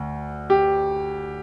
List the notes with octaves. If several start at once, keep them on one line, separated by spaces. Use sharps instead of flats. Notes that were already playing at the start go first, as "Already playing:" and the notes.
Already playing: D2
G4